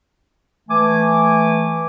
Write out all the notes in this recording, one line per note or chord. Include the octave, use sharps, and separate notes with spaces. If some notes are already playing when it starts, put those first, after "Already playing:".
E3 A3 G#5 D6